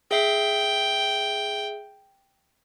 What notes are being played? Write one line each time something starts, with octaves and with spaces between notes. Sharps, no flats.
G#4 E5 G5 C7